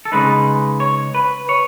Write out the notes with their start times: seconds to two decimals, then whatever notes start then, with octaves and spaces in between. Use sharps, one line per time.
0.05 A4
0.12 C#3 G#3 D#4 B4
0.80 C#5
1.15 B4
1.49 C#5